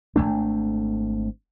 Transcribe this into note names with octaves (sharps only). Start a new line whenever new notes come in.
G#1 G#2 A3 D4